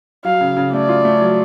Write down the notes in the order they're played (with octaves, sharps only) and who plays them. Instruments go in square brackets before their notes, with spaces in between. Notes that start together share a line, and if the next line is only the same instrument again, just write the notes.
[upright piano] F#3 [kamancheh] F5
[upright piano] C#3
C#3
[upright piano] A3 [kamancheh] D5
[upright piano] F4
A3
F#3